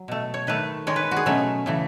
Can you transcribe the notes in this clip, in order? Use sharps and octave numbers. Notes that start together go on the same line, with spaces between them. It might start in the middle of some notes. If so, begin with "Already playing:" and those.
Already playing: F#3
B2 A3
C#5
D#3 A3 B4
D#3 G#3 C#5
B4
F#4
G#4
B2 F#3 A3 C#4
C#3 E3 A3